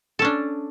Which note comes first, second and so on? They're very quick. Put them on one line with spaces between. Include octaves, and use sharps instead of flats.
A4 C#4 D4